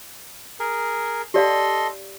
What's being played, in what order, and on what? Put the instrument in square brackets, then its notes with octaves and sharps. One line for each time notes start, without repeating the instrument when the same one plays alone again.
[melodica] G#4 A#4
[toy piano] G4 D5 F5 [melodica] A4 D#5 C6